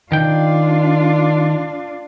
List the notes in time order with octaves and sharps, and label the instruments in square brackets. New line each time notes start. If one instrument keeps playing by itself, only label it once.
[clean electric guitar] D#3 G5 [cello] D4 F4